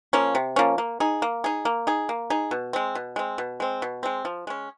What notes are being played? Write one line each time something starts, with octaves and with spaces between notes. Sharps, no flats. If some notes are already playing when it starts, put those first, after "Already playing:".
F3 A#3 C#4
C3
F3 A#3 C#4
A#3
D#4 G#4
A#3
D#4 G#4
A#3
D#4 G#4
A#3
D#4 G#4
B2
G#3 C4
B2
G#3 C4
B2
G#3 C4
B2
G#3 C4
F3
G#3 C#4